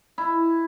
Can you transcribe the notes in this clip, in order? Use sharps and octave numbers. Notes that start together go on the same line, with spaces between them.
E4